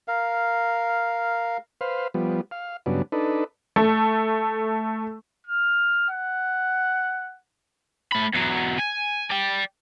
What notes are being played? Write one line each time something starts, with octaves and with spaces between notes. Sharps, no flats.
A#4 F5
B4 C5 F5
F3 G3 B3
F5
G2 C#3 F#3 B3 D4
D4 D#4 A4 B4
A3
F6
F#5
A3 B5
E2 F#3
G#5
D5 G5